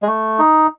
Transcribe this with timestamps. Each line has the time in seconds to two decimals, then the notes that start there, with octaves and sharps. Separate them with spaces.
0.03 G#3
0.07 A3
0.39 D#4